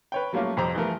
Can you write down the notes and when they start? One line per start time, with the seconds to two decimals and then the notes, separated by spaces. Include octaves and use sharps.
0.12 B4 C#5 G5
0.33 F#3 G3 A3 A#3 C#4 F4
0.57 F2 C3 G4 C5 A#5
0.75 E3 F3 G3 A3 A#4